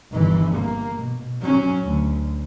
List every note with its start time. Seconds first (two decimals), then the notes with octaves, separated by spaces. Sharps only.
0.11 G1 E3
0.55 A#3
1.01 B2
1.41 F#3 C#4
1.84 D2